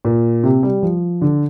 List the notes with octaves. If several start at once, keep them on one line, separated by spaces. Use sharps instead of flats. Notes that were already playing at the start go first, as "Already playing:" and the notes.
A#2
C3
G3
F3
D3